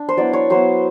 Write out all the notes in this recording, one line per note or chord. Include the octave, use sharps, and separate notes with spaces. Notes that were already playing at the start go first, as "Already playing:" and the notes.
Already playing: D4
C5
F#3 B3 E4 D5
C#5
F#3 B3 E4 C5